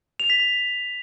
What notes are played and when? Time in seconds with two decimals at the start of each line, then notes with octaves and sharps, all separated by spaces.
0.20 F7
0.30 B6
0.40 B6